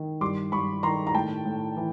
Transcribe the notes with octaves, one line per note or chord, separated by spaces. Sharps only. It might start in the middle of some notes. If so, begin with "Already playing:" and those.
Already playing: D#3
G2 C6 D6
G2 B5 C#6
D#3 A#5 C6
A#5
A2 G5 A5
A2
E3